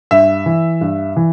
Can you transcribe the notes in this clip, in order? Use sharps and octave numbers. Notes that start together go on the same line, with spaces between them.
G2 E5
E3
G2
E3